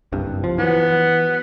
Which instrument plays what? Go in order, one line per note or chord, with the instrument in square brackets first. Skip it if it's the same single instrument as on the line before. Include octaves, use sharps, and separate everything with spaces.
[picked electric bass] F#1 C2 G2
F3
[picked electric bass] E3 F#3 [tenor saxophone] B3